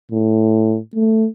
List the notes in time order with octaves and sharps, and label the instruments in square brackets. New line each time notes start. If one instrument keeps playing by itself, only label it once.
[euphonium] A2
A3